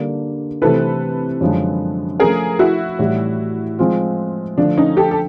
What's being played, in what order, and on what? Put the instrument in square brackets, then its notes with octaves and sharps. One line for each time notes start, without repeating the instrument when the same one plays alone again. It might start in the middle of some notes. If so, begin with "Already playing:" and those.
Already playing: [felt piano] D3 G3 A#3 D4
[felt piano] C3 E3 A3 C4 E4 [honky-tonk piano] A4 B4
[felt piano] F#2 D3 F3 G#3
[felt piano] F3 A3 C#4 [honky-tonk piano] G#4 A#4
[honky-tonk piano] E4 F#4
[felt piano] A2 E3 G3
F3 G#3 C4 F4
[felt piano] D3 F3 A3 [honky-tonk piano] D4
[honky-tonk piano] C#4 D#4
G4 A4
A4